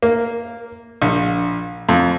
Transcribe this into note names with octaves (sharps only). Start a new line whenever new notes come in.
A#3
A#1
F2